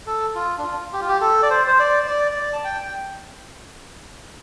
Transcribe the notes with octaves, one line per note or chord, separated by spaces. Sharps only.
A4
F4
D4
F4
G4
F4
G4
A4
D5
C5
C5
D5
D5
D5
A5
G5
G5